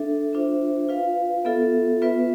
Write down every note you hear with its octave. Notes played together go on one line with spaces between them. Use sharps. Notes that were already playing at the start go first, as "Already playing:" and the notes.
Already playing: D4 A4 E5
D4 F4 C5 E5
F4 B4 F5
B3 F4 A4 E5
B3 F4 B4 E5